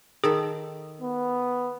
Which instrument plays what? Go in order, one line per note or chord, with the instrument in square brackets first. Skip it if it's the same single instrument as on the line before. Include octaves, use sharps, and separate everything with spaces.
[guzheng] D#3 A4 B5 [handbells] G#4
[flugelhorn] B3